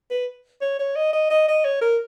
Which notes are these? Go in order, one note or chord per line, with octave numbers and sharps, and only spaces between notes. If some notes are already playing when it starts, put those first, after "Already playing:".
B4
C#5
C#5
D#5
D#5
D#5
D#5
C#5
A#4